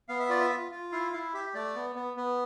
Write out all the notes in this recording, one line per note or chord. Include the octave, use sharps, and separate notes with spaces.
B3 F5
E5
F4 D5
E5
F4
F4
E4 F5
E4 F5
G4 E5
A3 D5
B3
B3
B3